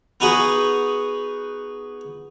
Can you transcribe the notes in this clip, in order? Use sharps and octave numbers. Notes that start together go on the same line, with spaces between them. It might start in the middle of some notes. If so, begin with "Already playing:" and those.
B3 D#4 F#4 G#4 B4